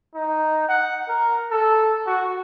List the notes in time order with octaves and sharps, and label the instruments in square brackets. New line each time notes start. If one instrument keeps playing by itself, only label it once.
[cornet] D#4
F#5
A#4
A4
F#4